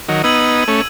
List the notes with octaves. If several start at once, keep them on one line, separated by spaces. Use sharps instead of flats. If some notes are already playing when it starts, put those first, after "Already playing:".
D#3 F#3
B3 D#4 E6 G#6 D#7 F#7
A3 C#4